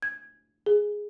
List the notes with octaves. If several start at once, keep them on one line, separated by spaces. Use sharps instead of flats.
G#6
G#4